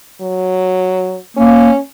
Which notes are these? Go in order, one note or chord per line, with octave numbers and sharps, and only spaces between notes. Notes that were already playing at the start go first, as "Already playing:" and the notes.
F#3
A#3 C#4